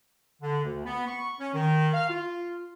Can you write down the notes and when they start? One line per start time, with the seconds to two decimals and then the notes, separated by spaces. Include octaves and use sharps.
0.42 D3
0.64 D2
0.85 B3
1.07 C#6
1.40 C#4
1.53 D#3
1.94 F5
2.09 F4